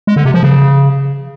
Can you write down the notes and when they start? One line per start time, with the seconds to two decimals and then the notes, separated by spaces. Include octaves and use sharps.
0.07 G#3
0.16 D3
0.25 C3
0.34 F3
0.43 C#3